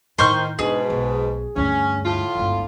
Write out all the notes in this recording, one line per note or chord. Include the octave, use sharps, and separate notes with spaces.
A2 D#3 D#4 C5 C#6 F6
G#2 B2 D4 G#4
B1
D2 G2 C#4
A2 F4
G1 C#2